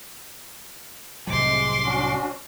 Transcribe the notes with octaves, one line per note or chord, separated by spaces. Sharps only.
C2 A2 C3 F#3 G#3 C6 D6
C#4 D4 F#4